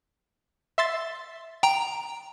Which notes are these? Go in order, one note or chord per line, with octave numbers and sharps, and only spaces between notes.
E5 C6 A6
G5 A#5